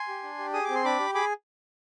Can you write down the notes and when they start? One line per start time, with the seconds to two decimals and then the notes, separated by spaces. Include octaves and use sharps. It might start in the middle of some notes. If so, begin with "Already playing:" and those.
Already playing: G#5 C6
0.08 G4
0.23 D4
0.39 G4
0.54 G#4 D#6
0.64 C4 D6
0.75 C6
0.84 D4 B5 D6
0.99 G4
1.14 G#4 B5 D6